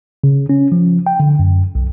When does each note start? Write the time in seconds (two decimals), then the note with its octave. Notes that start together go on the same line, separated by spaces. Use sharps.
0.24 C#3
0.49 C#4
0.72 F3
1.07 G5
1.20 D3
1.39 F#2
1.75 B1